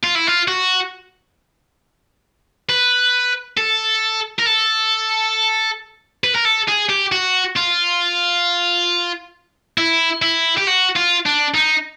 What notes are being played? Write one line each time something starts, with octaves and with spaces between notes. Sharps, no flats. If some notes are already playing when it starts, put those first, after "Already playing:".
F4
E4
F4
F#4
B4
A4
A#4
A4
B4
A#4
A4
G#4
G4
F#4
F4
E4
E4
G4
F#4
F4
D4
D#4